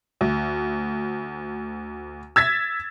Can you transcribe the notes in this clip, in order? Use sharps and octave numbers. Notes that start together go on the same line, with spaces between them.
D2
E6 G#6 A6 B6